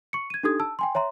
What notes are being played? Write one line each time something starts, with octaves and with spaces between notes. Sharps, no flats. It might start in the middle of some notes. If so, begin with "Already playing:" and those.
C#6 C#7
G#6 D#7
D4 D#4 G4 A4 D#6 G#6
A5 E6
G5 G#5 C6
C#5 E5 A#5 C6